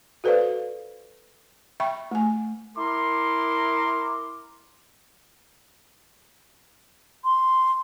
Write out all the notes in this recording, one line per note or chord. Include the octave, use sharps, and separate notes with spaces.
F#4 A4 B4 C5 D5 F5
E5 G5 B5 C#6
A3 G#5
E4 A#4 C6 D6
C6